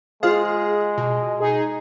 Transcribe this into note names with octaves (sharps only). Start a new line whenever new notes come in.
G#3 F4 G#4 C5 F5
B2
D#4 G#4